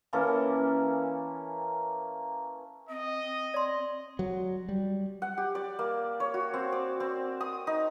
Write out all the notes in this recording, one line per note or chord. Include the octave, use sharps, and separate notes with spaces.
E3 A#3 C#4 A4
C4 D#5
D5 C6
F#3
G3
F#5
G4
D5
A#3
C#5
F#4
C4
D5
C4
D#6
D#4